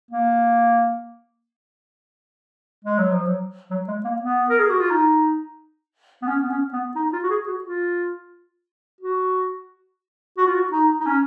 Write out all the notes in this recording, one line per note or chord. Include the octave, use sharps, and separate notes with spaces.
A#3
G#3
F#3
F3
F#3
F#3
G#3
A#3
B3
A#4
G#4
F#4
F4
D#4
B3
C#4
B3
C#4
B3
D#4
F4
F#4
G#4
F#4
F4
F#4
F#4
F4
F#4
D#4
D#4
C#4